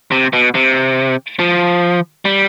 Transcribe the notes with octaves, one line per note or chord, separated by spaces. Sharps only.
C3
B2
C3
F3
G3